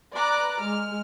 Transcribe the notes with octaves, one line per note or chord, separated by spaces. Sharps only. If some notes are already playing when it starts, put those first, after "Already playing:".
B4 D5 A#5 D6 F#6
G#3 F6